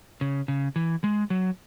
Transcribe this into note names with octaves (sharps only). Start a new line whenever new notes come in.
C#3
C#3
E3
G#3
F#3